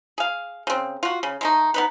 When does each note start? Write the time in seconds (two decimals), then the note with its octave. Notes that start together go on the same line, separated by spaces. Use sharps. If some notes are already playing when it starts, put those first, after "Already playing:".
0.18 G#4 F5
0.67 C#3 C4
1.03 F4 F#4
1.23 C#3
1.41 G#3 A3 D#4
1.74 B3 D#4 B4